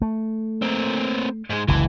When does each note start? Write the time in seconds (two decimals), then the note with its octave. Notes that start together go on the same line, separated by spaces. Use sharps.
0.02 A3
0.62 A#3 C4
1.50 G#2 G#3
1.68 F#1 C#2 D3 E3